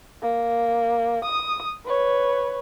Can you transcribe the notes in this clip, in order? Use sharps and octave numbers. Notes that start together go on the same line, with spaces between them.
A#3
D#6
B4 C#5